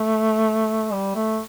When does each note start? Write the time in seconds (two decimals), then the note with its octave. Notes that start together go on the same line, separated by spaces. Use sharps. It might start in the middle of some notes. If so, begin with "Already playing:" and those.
Already playing: A3
0.92 G3
1.15 A3